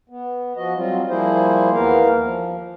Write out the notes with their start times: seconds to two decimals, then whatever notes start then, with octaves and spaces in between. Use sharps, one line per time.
0.09 B3
0.56 F3 F#4 D#5
0.76 F#3 G3 C4 F4
1.09 F3 G3 A#3 E4 G#4 C5
1.74 D#2 E3 B3 A#4 F5
2.21 F3